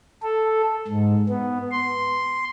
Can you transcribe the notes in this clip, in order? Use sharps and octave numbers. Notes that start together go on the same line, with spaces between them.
A4
G#2
B3
C6